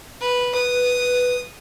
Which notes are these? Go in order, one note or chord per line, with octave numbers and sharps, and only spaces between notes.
B4
B4 D#6